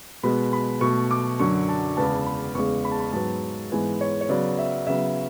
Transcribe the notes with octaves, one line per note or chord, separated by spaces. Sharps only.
B2 G#3 B3 B5
B5
B2 A3 C#6
D6
F#2 D3 F#3 C#6
A5
E2 C#3 G#3 B3 A5
B5
E2 C#3 G#3 C#6
B5
A5
B5
G#2 F#3 B3 A5
G#2 E3 G#3 B3 G#5
C#5
C#5
C#3 F#3 B3 D5
E5
C#3 F#3 B3 E5